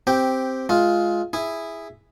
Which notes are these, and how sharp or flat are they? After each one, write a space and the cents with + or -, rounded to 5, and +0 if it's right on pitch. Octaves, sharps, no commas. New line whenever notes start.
C4 +0 G4 +0 G5 -10
G#3 +20 F4 +0
E4 +0 G#4 -10